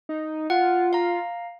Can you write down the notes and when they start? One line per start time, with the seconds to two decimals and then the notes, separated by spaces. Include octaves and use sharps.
0.09 D#4
0.50 F4 F#5
0.93 F5 A#5